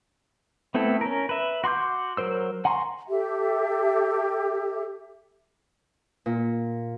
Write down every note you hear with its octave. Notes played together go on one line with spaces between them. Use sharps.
A3 B3 C4 E4 A4
C#4 A#4
B4 E5
F#4 C6 D6 G6
F#3 A#4 C5 E6
F#5 G#5 A#5 C6 C#6
G4 A4 E5
A#2